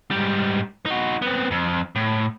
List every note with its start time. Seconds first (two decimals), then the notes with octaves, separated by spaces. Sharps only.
0.11 G#2 G3
0.86 D#4 F#4
1.22 B3 C4
1.51 F2
1.96 A2